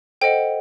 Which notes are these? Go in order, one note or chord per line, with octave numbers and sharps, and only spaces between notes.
A4 C5 D#5 F#5 G5